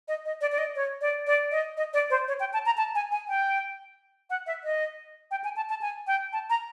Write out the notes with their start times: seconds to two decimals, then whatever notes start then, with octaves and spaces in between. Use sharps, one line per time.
0.08 D#5
0.25 D#5
0.41 D5
0.52 D5
0.58 D#5
0.76 C#5
1.01 D5
1.27 D5
1.51 D#5
1.77 D#5
1.94 D5
2.10 C5
2.28 C#5
2.40 G5
2.53 A5
2.66 A#5
2.77 A5
2.95 G#5
3.11 G#5
3.28 G5
4.30 F#5
4.47 E5
4.64 D#5
5.31 G5
5.44 G#5
5.56 A5
5.69 A5
5.81 G#5
6.07 G5
6.33 A5
6.50 A#5